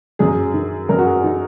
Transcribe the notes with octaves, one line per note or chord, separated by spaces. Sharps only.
F#2 G#4
D#3
F#2 A#4
F#4
G#4
D#3 D#4